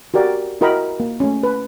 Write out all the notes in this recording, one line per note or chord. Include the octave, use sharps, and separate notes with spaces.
F#4 G4 A#4 D5
E4 F#4 A#4 D#5 G5 B5
A#3
A3 C#4
B4